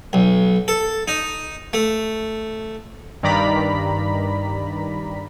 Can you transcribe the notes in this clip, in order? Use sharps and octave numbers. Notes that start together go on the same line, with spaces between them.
B1
A4
D#4
A3
G2 D#3 D5 A#5 B5 B6